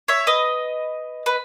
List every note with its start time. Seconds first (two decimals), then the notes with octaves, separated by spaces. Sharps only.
0.08 C#5 E5
0.27 B4 D#5
1.26 B4